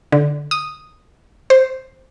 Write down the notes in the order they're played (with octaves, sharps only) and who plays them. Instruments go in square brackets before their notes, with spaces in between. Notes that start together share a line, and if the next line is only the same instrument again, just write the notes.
[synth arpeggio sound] D3
D#6
C5